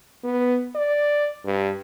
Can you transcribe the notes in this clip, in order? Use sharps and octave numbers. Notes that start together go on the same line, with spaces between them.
B3
D5
G2